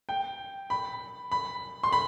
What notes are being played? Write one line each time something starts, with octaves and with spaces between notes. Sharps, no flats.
G5
B5
B5
C6
B5